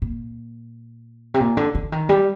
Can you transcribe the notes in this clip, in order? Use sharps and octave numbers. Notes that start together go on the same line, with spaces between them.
A#2
C3
A#2
D3
D3
D#3
G3